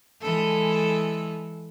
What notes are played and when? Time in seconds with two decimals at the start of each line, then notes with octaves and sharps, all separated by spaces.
0.22 E3 G#3 A4